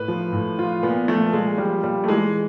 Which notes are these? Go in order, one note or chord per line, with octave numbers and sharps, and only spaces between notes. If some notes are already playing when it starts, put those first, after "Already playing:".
Already playing: A2 B4
F3
A2
F3 F4
A#2 B3
F3 A3
A#2 G#3
F3 G3
A#2 G3
A3
E3 G#3